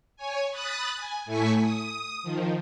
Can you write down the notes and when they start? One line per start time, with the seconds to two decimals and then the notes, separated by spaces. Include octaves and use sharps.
0.16 C#5 G#5
0.51 B5 D#6 F#6 A6
0.96 G#5
1.25 A2 A3 E4 G#5 C#6 B6
1.61 D#6
2.23 D#3 F3